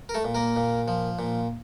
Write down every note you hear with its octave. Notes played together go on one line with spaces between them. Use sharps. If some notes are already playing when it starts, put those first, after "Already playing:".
A#4
A3 A4
A#2
A#3 A#4
A#2
F3
A#2